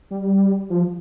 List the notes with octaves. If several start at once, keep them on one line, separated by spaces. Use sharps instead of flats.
G3
F3